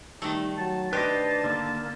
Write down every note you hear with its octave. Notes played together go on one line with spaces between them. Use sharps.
D#3 G3 A3
F#3 A5
D4 G4 B4 C5 D#5
D3 A#3